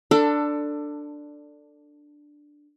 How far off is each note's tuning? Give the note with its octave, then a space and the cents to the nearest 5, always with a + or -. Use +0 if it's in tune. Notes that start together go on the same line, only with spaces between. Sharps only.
D4 +5 A4 +20 C6 -40